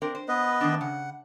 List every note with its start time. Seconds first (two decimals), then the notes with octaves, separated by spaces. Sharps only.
0.02 C4 D4 A#4
0.15 C5
0.28 B3 B4 D#5
0.61 D#3 A3 D4
0.81 C#3 F#5